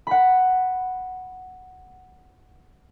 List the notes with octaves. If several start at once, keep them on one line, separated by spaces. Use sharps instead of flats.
F#5 B5